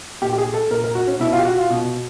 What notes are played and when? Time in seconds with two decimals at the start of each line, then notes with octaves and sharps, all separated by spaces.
0.22 A#2 G4
0.33 G4
0.38 G#4
0.54 A4
0.71 A#2 A#4
0.84 A#4
0.95 F#4
1.07 C#4
1.20 B2 E4
1.33 F4
1.38 G4
1.45 F#4
1.58 F4
1.70 B2